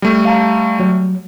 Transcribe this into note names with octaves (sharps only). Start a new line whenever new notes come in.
G3 A3
F5 A5 A#5
F#3